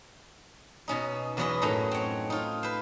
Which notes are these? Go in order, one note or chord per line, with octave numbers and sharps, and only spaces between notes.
B2 C#4 D#4
E2 F#3 E4 F#4 B4 D#5
F#2 A2 C#4 D#4 A#5
C4 C#5
D#4 F4
B4 C5